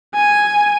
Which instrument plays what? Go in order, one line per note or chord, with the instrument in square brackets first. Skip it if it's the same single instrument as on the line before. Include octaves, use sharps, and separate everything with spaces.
[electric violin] G#5